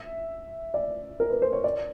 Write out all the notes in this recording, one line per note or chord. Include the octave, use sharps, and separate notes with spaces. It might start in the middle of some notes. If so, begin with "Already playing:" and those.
Already playing: E5
D5
A#4
B4
C5
C#5
D5